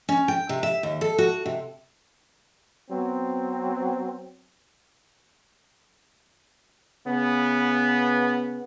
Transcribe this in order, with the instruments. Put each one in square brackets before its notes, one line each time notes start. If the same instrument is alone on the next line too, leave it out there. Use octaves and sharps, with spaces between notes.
[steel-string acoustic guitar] C#4
G5
C3
E5
D#2
A4
F#4
C3
[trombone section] F#3 B3 C4
C#3 B3